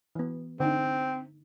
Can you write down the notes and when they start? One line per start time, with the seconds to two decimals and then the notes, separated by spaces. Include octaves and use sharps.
0.15 E3 B3
0.60 D3 C4 D#4